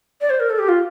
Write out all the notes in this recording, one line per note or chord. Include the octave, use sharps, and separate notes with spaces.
D5
C5
A#4
A4
G4
F4